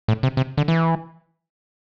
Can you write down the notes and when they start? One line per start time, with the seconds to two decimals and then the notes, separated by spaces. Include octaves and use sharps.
0.08 A2
0.23 C3
0.37 C3
0.57 D3
0.68 E3